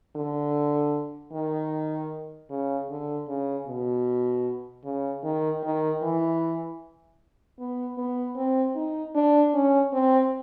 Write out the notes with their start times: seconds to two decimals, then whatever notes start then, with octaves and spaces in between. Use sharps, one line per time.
0.16 D3
1.32 D#3
2.50 C#3
2.90 D3
3.28 C#3
3.67 B2
4.84 C#3
5.23 D#3
5.63 D#3
6.02 E3
7.59 B3
7.98 B3
8.36 C4
8.75 D#4
9.15 D4
9.54 C#4
9.93 C4